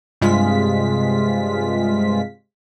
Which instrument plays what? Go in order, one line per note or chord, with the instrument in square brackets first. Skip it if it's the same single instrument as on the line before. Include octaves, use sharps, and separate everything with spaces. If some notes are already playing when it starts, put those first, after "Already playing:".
[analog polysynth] G2 C3 G#3 F4 B6